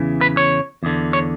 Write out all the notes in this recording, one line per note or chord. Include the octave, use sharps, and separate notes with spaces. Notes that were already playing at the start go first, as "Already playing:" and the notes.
Already playing: E2 C#3 E3
B4
C#5
E2 D3
C#5